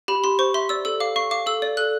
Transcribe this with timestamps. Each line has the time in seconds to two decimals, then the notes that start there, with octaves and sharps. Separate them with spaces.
0.08 G4 B5
0.24 G4 C6
0.39 C5 C#6
0.54 E5 C6
0.69 D5 E6
0.85 A4 E6
1.00 F5 D6
1.16 F5 C#6
1.31 F5 D6
1.46 A4 E6
1.62 D5
1.77 A4 F#6